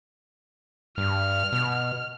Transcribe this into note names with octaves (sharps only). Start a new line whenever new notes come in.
G2 F6
B2